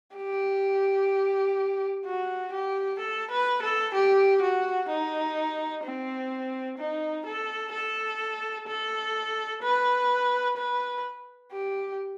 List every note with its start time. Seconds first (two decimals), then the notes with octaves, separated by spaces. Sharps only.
0.16 G4
2.05 F#4
2.53 G4
2.99 A4
3.31 B4
3.63 A4
3.94 G4
4.42 F#4
4.89 D#4
5.84 C4
6.79 D#4
7.26 A4
7.73 A4
8.68 A4
9.63 B4
10.57 B4
11.52 G4